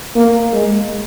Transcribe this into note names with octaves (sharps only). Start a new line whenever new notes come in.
A#3
G#3